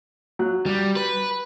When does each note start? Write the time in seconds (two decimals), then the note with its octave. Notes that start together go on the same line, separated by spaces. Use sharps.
0.39 F#3 F#6
0.66 G3
0.96 B4